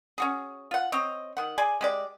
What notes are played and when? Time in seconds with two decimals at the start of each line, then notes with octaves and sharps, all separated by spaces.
0.18 C#4 F#4 G#4
0.71 F4 F#5
0.92 C4 C#5 D#5
1.37 D#3 F#5
1.58 G#4 D5 G#5
1.81 G#3 G4 D5